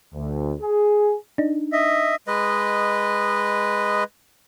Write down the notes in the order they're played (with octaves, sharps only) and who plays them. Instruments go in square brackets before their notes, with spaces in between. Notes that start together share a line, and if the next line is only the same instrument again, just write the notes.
[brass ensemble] D2
G#4
[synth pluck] D4 D#4
[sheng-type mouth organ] D#5 E5
[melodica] G#3 B4 D#5